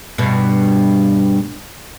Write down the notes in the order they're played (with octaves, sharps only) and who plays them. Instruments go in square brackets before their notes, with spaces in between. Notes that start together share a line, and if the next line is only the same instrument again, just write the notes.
[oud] G2 B2